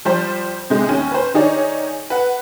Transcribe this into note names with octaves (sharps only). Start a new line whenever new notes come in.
F3 G3 C5
C3 G#3
D#2 C#4
B4 C5
D#3 D#4 G#4 C#5 D5
B4 F#5